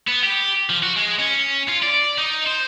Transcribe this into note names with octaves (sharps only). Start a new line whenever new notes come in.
B3
G4
F3
F#4
G#3
C#4
F4
D5
D#4
C5